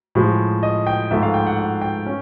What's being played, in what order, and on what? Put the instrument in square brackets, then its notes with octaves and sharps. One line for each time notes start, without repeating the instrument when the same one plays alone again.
[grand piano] A2 F3 G#3
D#5
G5
G#2 F3 A3 E5
F5
G5
F#5
F#5
G5
C#4